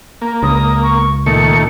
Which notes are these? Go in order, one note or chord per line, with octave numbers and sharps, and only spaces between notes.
A#3
C#2 D#6
C#6
A#2 D#3 A3 C#7